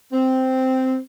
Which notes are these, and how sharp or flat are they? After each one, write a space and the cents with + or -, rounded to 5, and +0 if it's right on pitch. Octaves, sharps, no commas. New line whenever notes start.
C4 -5